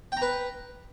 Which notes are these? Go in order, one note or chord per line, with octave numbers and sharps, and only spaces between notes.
B4 G5 A#5